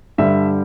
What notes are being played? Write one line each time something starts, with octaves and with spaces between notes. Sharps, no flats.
G2 D3 G3 E5